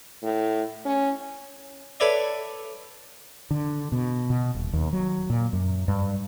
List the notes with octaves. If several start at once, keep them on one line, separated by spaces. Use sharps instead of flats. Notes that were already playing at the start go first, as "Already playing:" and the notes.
A2
C#4
A4 B4 C#5 D5 E5
D3
B2
B2
D#1
D#2
F#3
A#2
F#2
G2